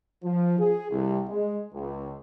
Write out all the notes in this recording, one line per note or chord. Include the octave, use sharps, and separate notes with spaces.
F3
G#4
C2
G#3
C#2